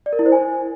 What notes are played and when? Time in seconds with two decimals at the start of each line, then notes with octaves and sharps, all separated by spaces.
0.06 D5
0.13 A#4
0.19 E4
0.26 C5
0.32 G#5